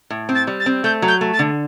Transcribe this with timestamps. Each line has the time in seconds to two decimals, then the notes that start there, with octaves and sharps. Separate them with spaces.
0.10 A2
0.29 C4
0.35 A6
0.47 G3
0.60 A6
0.66 C4
0.84 A3 G6
1.02 F#3
1.08 G6
1.21 A3
1.33 A6
1.39 D3